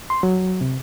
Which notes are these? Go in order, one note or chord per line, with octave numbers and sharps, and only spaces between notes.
C6
F#3
C3